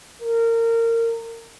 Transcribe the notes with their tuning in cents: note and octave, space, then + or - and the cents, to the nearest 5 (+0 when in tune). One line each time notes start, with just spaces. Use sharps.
A#4 -25